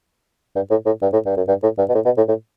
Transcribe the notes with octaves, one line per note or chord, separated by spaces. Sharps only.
G2
A2
A2
G2
A2
G2
F#2
G2
A2
G2
B2
A2
B2
A2
A2